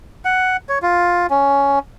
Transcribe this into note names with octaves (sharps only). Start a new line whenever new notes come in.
F#5
C#5
F4
C#4